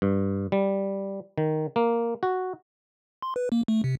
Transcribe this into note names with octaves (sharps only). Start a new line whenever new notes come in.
G2
G3
D#3
A#3
F#4
C6
B4
A#3
A3
C3